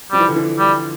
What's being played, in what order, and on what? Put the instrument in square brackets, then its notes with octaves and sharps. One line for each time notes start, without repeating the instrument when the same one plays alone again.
[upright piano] F3 [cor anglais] G3
[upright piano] E3
D3
E3
[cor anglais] G3